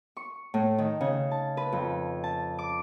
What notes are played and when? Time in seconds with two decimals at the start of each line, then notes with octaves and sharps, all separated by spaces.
0.17 C#6
0.54 A2
0.78 D#3
1.01 C#3
1.31 A5
1.57 B4
1.73 F2
2.24 A5
2.59 D6